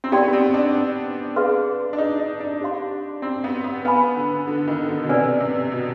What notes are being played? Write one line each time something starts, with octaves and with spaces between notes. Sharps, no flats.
C4
B3 D#4 G4 D5 G5 C6
C4
D4
G#4 B4 F5 C6
D4
D#4
D#4
D4
G4 C5 F5 C6
C4
B3
B3
B3 B4 F5 G#5 B5
D3
D3
D#3
D3
B2
C3 B4 D5 G#5
C3
B2